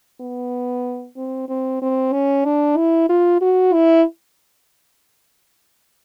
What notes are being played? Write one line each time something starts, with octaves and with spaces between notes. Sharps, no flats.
B3
C4
C4
C4
C#4
D4
E4
F4
F#4
E4